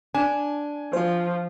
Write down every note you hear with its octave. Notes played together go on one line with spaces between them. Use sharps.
D4 G#5
F3 F4 C5